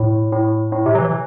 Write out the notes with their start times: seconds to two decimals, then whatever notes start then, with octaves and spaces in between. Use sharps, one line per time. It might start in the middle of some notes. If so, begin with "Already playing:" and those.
Already playing: A2
0.32 A2
0.72 A2
0.86 C3
0.95 F#3
0.99 E3